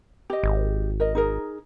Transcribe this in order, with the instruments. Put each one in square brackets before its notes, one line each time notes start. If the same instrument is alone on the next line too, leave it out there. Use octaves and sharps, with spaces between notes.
[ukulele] G4 D#5
[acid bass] G#1
[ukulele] A#4 D#5
D#4 G#4 A#4